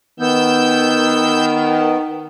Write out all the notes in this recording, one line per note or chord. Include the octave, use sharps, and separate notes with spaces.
D#3 B3 E6 G6